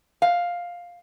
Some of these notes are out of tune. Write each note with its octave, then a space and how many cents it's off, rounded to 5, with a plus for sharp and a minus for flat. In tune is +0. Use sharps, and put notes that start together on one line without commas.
F5 +5